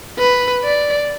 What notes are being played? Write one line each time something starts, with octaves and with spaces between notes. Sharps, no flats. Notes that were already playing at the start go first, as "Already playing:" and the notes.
B4
D5